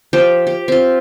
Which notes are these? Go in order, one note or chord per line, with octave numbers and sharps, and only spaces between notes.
F3 G4 G5
G4
C4 F4